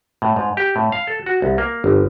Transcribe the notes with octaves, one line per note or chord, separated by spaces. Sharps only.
A2
G#2
G4
A2
F5
A4
F#4
C2
A#3
G1